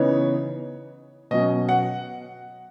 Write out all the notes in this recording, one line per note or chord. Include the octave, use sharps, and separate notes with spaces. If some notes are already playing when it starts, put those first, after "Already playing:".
Already playing: C#3 E3 B3 D#4 C#5
B2 F#3 C#4 D#5
F#5